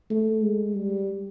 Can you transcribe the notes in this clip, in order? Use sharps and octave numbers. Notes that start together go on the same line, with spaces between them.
A3
G#3
G3